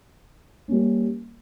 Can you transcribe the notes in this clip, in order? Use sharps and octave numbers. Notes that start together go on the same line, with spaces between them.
G3 A#3 C#4